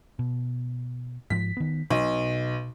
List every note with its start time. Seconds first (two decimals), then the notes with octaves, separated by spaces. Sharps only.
0.19 B2
1.30 G#2 F3 B6
1.57 D#3 B3
1.90 B1 B2